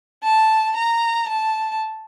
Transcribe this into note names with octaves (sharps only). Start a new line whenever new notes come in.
A5
A#5
A5